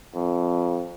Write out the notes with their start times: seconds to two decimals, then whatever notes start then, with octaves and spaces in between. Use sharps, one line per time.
0.15 F2